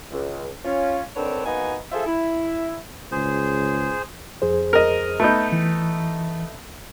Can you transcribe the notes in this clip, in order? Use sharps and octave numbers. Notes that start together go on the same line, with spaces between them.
C#2
C#4 F4
D3 D#3 C4 D4 B4 C#5
A#3 B3 D#4 F#4 B4 G#5
F4 G#4 A4 C5 E5
E4
C#2 G#4 C5
F2 G#4 C5
A#4 D#5
A3 B3 D#4 A5 G6
E3